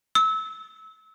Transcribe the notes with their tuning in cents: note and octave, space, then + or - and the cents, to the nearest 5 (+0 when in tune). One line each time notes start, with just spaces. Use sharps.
E6 -25